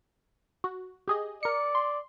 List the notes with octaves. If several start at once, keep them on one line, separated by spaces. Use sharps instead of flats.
F#4
G4 G#4 D#5
A#4 D5 C#7
C6